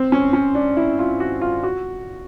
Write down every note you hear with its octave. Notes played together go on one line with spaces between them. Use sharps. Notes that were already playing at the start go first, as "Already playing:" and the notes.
Already playing: C4
C#4
C#4
D4
E4
F4
F#4
F4
F#4